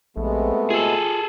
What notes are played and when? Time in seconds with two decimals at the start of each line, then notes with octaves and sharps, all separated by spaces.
0.17 A#1 C3 G#3 A3 B3
0.70 F4 G#4 A4